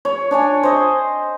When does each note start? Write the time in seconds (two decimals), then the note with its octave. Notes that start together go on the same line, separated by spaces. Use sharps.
0.05 C#5
0.31 D4 C#5 G#5
0.63 C5 D#5